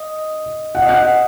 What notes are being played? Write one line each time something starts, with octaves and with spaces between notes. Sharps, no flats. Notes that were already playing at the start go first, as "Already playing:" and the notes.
Already playing: D#5
F#5
D#5
F#5